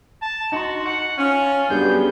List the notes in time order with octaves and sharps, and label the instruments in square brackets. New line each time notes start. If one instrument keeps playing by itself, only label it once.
[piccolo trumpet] A5
[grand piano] D#4 C6 [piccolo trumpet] F#4
[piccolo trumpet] F#5 [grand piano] C#7
[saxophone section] C#4 [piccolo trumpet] F4
[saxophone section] F#2 [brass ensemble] G3 B3 [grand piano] D4 G#4 [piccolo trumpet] G6